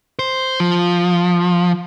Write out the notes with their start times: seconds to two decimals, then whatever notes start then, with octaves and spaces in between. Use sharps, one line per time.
0.19 C5
0.60 F3